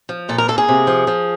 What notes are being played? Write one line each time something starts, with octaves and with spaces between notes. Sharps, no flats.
F3
A#2 A4
A#4
A#3 A4
G#4
C3
F3
F3